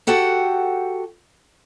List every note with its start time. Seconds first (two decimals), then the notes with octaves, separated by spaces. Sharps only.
0.07 F#4 G4 A4 F#5 G5